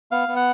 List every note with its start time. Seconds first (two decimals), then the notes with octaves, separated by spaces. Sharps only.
0.11 B3 F5
0.28 B3
0.36 F#5